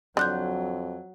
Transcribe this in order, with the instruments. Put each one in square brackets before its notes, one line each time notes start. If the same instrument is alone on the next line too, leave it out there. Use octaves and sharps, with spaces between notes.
[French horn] F2 [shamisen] D3 [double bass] F#3 [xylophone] C6 F#6 G6